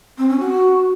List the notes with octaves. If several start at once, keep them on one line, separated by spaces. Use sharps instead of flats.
C4
C#4
F#4